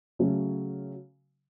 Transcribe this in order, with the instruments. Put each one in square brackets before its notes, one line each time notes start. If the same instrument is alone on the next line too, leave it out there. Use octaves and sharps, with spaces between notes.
[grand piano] C#3 F#3 A3 C#4